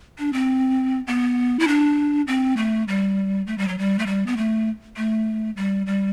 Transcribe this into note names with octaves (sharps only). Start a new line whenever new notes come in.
D4
C4
B3
E4
D4
C4
A3
G3
A3
G3
F#3
G3
A3
G3
B3
A3
A3
G3
G3